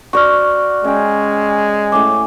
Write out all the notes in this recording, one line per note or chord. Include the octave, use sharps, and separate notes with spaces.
F#4 C5 D5 C#6 F6
G#3 C#4 G5
A2 C#4 G#5 D6